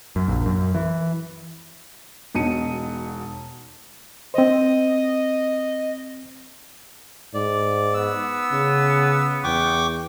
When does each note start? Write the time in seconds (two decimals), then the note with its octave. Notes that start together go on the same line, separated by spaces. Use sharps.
0.16 F#2
0.28 A#1
0.46 F#2
0.75 E3
2.34 E1 B2 D#4 A5 C#7 D#7
4.34 C4 C5 D#5
7.34 G#2 D5
7.94 B3 E6
8.52 C#3
9.44 E2 G5 C#6 D6